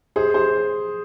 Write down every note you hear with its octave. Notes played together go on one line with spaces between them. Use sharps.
G#4 C5
G#4 C5